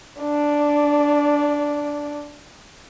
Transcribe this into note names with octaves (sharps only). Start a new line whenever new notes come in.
D4 D5